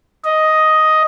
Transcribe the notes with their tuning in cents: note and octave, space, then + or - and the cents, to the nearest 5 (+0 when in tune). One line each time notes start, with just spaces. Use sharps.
D#5 +5